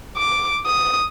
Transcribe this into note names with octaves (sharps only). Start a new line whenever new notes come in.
D6
D#6